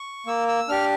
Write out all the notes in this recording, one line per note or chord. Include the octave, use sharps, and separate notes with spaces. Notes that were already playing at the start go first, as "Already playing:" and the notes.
Already playing: C#6
A#3 E6
E6
D4 G4 F6